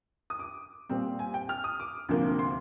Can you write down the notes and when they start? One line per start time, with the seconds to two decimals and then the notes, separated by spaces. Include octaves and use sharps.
0.30 D#6
0.39 D6
0.89 A#2 G3 C4
1.19 G#5
1.34 G5
1.49 F6
1.64 D#6
1.80 D6
2.09 D2 C3 F3 A#3
2.39 C6